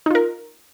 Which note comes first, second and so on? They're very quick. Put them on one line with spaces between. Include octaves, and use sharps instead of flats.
D#4 F4 A#4